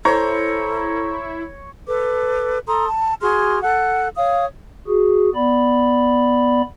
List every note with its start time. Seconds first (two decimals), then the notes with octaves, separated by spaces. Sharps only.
0.05 E4 A4 C5 C#5 A#5
1.87 A4 B4 D6
2.67 A4 A#5 C6 D#6
2.86 A5
3.22 F#4 G#4 C6 F6
3.62 A4 F#5 F#6
4.16 C#5 F5 D#6
4.87 F#4 G#4
5.35 B3 D5 B5